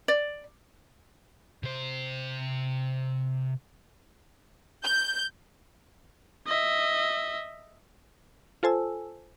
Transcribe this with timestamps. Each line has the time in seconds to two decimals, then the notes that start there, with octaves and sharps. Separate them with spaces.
0.08 D5
1.63 C3 C5
4.84 G6
6.47 D#5 E5
8.63 F4 A4 C5 G#5 A5 E6